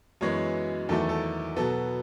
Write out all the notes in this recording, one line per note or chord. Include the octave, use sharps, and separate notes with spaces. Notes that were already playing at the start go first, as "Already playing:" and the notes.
F#2 E3 G#3 B3 C#5
E2 D#3 F#3 A3 A4
A4
B2 F#3 B3 A4